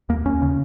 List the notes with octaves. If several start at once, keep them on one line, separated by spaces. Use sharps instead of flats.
D#2 A#3
D#2 C#4
C#3